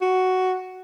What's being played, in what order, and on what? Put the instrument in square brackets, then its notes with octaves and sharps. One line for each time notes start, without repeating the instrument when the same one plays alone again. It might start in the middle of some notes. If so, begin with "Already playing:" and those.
[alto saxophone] F#4